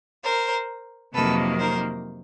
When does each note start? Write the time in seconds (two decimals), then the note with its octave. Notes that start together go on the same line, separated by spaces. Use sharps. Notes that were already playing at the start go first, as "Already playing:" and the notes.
0.24 A#4 C5
1.14 F2 C3 D#3 F#3 A#3 A4 B4
1.60 A#4 C5